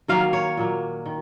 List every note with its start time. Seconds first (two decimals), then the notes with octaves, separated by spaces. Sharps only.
0.08 D#3 F#3 A#3 F5
0.33 C#5
0.57 A#2 F#3 A#3
1.06 D#3